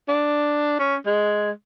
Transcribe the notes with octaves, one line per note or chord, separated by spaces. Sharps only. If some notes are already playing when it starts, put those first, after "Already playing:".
D4
C#4
G#3